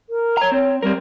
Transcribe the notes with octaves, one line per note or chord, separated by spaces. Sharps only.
A#4
C#5 A#5
C4 C#5
G3 C4 A#4